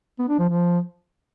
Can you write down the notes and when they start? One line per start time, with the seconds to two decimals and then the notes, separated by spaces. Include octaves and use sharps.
0.19 B3
0.29 D4
0.39 F3
0.49 F3